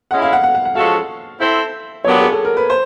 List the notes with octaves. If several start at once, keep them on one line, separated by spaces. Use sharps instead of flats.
G#3 C#4 E4 F#5
F5
F#5
F#5
F#5
F#5
F3 G#3 C#4 F#4 A4 F5
C4 E4 A4 C5 E5
A#2 F#3 B3 D4 G4 C#5
G#4
A4
A#4
B4
C5